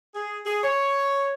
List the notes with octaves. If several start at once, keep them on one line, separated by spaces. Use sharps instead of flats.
G#4
G#4
C#5